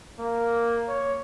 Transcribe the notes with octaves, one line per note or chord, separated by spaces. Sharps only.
A#3
C#5